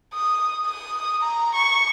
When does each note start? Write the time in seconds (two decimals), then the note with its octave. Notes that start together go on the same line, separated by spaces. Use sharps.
0.14 D#6
0.66 D#6
1.22 A#5
1.55 C#6